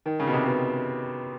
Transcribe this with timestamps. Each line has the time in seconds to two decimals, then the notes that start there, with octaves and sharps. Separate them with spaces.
0.06 D#3
0.19 C#3
0.27 B2
0.33 C3
0.46 B2